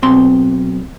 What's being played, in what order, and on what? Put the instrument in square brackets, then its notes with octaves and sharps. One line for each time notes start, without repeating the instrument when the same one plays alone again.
[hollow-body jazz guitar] B1 C4 C6